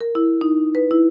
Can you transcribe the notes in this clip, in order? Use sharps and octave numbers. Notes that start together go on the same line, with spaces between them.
A#4
E4
D#4
B4
E4